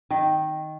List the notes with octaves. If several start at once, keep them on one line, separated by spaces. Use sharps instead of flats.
D#3